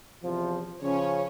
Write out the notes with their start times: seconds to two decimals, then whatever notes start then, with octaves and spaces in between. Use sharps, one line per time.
0.23 E2 C3 F3
0.81 C#3 F3 C#4 C#5